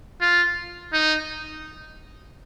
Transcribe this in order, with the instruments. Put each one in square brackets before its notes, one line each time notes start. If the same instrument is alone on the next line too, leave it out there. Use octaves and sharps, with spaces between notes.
[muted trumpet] F4
D#4